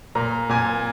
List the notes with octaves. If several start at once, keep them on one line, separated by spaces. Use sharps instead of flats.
A#2 A#5
A#2 G#5